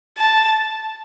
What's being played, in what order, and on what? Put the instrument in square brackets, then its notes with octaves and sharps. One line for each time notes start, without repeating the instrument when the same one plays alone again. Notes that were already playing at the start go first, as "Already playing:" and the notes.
[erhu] A5